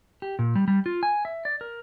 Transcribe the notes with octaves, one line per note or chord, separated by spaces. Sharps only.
G4
A#2
G3
G3
F4
G#5
E5
D5
A#4